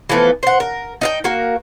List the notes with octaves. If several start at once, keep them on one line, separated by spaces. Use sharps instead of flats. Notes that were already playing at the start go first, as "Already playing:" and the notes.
E3 F3 A3 B3
C5 F#5
A#4
D#4 F5 G5
A#3 F#4 A#4